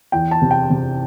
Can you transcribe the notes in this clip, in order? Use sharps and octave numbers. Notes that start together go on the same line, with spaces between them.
E2 G5
A5
C3
G5
C3